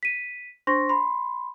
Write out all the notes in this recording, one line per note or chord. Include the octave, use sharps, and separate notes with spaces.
B6 D#7
D4 C5 C6 C#6 A#6
B5 C6